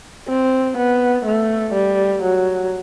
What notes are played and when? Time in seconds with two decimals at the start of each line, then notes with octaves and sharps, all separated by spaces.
0.28 C4
0.77 B3
1.25 A3
1.73 G3
2.23 F#3